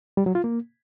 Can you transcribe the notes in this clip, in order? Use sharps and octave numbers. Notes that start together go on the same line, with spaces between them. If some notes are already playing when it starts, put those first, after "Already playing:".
G3
F#3
F4
A#3